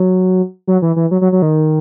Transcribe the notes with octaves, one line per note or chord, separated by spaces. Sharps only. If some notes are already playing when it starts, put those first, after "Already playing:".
Already playing: F#3
F#3
E3
E3
F#3
F#3
F#3
D#3